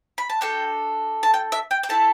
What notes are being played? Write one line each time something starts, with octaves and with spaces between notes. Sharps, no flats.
B5
A5
D4 F#4 A4 G5
A5
G5
E5
G5
G5
A3 E4 A4 A5